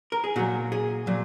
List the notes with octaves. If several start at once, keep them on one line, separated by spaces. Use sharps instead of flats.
A#4
G#4
A#2 F#3 F#4
G#4
A#2 F#3